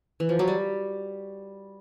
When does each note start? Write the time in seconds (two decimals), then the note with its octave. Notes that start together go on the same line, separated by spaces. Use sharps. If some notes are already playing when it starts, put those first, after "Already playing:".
0.20 E3
0.29 F3
0.39 F#3
0.48 G3